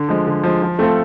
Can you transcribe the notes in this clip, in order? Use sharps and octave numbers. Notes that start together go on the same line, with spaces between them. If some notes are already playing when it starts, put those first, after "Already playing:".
Already playing: D3
F3 G#3
D3
F3 G#3
F3
A3 C4 F4 A4